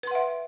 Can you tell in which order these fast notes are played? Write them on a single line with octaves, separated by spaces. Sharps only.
B4 C6 F#5 E5